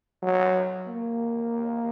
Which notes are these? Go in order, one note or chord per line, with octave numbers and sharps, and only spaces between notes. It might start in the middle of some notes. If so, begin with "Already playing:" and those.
F#3
A#3